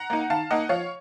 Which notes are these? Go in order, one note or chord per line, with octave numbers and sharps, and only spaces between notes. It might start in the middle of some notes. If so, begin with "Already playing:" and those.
Already playing: F#5 A#5
A#3 D#4
D#3 F5 A5
A#3 D#4 D#5 F#5
F3 C#5 F5